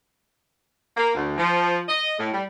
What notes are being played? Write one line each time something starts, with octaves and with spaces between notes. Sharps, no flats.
A#3
D2
F3
D#5
A2
G3